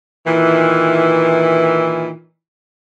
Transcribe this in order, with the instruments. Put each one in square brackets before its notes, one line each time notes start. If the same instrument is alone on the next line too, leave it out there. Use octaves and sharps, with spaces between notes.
[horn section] A#2 D#3 E3